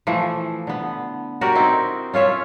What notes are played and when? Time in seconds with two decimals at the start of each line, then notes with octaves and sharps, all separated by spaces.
0.07 E3 F3 A3
0.67 D3 B3
1.41 F#4 G4 A#4 D5
1.55 C4 D#4 E4
2.14 C#4 F4 C#5 E5